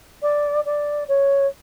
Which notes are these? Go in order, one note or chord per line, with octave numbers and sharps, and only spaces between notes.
D5
D5
C#5